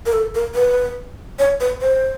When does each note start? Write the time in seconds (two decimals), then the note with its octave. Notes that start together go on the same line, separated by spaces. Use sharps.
0.06 A#4
0.13 A4
0.35 A#4
0.55 B4
1.39 C#5
1.60 B4
1.81 C5